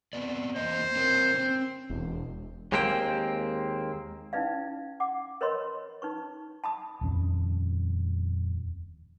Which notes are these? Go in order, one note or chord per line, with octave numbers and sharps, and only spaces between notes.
B3 C4 D5
E2 A#3 C5 D#5
C4 A#4 C#5
C4 C#4
E1
D#2 G#3 A#3 C4 G4 G5
C#4 D#4 E4 B4 D5 F5
F#5 D6
A#4 B4 C#5 D#5 B5 C6
D#4 B4 C#6
A5 B5 D#6
D#1 F2 C#4